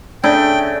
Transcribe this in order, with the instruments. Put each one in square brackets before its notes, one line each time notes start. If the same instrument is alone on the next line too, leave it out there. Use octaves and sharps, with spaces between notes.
[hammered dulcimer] C#3 A3 G#4 [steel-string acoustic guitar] D4 [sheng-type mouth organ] G5